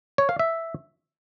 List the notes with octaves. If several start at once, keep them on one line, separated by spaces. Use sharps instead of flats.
C#5
F5
E5